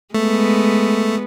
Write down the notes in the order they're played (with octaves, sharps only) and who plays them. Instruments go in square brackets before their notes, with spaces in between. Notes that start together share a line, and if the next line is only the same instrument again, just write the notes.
[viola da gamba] G#3 B3 [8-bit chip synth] A3